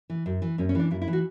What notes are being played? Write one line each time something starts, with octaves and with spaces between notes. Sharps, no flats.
E3
F#2
E3
F#2 C#4
C#4
E3 D4
F#2 E4
E4
E3
F#4